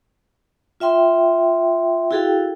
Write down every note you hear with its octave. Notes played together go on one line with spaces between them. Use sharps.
F4 E5 G5 C6
E4 F#4 G#4 A4 F5 G5